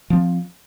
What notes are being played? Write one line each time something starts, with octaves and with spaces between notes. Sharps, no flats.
F3 C4